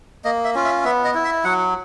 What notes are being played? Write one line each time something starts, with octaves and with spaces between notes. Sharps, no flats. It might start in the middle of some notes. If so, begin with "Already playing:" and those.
A#3 D#5
E5
C#4 F4
E5
B3 E5
D#5
E4
E5
F#3 F#5